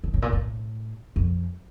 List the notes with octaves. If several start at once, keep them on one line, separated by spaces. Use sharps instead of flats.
D3
A2
A#2
A2
F2